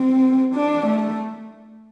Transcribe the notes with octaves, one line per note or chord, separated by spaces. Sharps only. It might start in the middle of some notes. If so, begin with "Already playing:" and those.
Already playing: C4
D4
A3